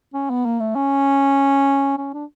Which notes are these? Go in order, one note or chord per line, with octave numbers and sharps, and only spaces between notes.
C#4
B3
A#3
A3
C#4
C#4
D4